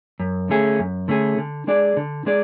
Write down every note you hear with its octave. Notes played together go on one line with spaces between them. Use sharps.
F#2
D3 A3 C#4 G#4
F#2
D3 A3 C#4 G#4
D3
G#3 D4 G#4 D5
D3
G#3 D4 G#4 D5